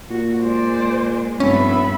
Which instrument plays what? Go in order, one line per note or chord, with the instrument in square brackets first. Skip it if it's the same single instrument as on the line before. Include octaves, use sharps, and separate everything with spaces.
[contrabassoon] A#2 [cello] F#4
[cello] G#3 [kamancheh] C5 D5
[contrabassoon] F1 [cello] G2 B3 [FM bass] C#4 [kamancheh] E5 B5